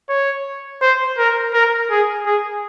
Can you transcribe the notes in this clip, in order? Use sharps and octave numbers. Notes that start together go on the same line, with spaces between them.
C#5
C5
A#4
A#4
G#4
G#4